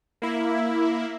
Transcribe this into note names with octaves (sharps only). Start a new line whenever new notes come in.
A#3 E4